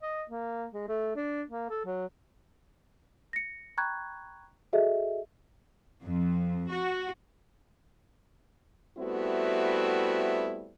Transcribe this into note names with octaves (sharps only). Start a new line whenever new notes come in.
D#5
A#3
G#3
A3
D4
A#3
A4
F#3
A#6 C#7
G5 A#5 B5 C#6 F#6 G#6
F#4 G#4 A4 D#5 E5
F2
F#4
G3 A3 B3 C4 E4 F#4